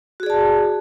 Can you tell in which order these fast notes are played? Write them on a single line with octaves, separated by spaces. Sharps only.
F#4 G#4 D5 A5